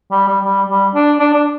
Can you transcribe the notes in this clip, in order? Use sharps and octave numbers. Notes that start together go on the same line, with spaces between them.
G3
G3
G3
G3
D4
D4
D4